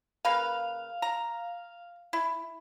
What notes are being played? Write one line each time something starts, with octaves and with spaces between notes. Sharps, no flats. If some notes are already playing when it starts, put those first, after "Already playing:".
C#3 A#3 B4 F5
A#5
E4